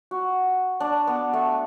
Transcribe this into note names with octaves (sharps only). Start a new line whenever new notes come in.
F#4
D4
B3
A3